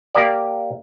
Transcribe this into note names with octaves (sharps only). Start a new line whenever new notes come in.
A#3 G4 A#4 D5